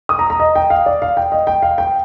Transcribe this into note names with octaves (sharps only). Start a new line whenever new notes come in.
D#6
A#5
A#5
D#5
G5
F5
D5
F5
G5
D#5
G5
F5
G5